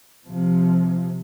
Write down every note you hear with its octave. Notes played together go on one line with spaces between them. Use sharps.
C3 F3